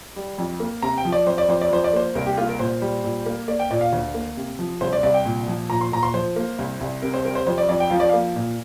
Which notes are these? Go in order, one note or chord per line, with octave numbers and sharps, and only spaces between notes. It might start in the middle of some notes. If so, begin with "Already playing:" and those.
G3
F2
A#3
C3 A#5
G5
F3
D5
F2 C5
D5
F2 C5
D5
F3 C5
D5
A#3 C5
C2 A#4
G4
A#3 F4
A#4
A#2 C5
G3
A#2
A#3
A#3 D5
G5
A#2 D5
F5
D2
A#3
C3
F3
C2 C5
D5
C2 D5
G5
A#2
F3
A#2 A#5
C6
A#2 A#5
C6
F3 C5
A#3
C2
C2
C3 A#4
C5
G3 A#4
C5
F2 C5
D5
F2 D5
G5
F3 F5
D5
A#3 F5
A#2